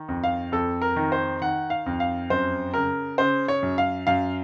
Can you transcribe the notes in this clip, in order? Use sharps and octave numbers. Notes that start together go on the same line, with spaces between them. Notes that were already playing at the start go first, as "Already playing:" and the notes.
Already playing: D#3
F2
F5
F2 A4
A#4
D#3
C5
D#3 F#5
F5
F2
F5
F#2 C5
C#3 A#4
C#3 C5
C#5
F#2
F5
F#2 F5